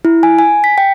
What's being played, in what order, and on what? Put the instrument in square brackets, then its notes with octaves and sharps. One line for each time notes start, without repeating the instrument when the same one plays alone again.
[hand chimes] E4
G#5
G#5
B6
G5